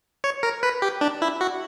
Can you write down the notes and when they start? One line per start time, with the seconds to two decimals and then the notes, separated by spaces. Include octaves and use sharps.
0.24 C#5
0.43 A#4
0.63 B4
0.82 G4
1.01 D4
1.22 E4
1.41 F#4